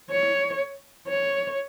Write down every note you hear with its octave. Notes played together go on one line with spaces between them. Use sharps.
C#5
C#5